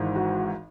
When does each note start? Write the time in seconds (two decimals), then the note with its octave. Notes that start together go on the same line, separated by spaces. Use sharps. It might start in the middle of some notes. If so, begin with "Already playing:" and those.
Already playing: G#1 G#2 E3
0.16 F#4